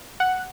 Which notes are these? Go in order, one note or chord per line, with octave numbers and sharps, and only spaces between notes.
F#5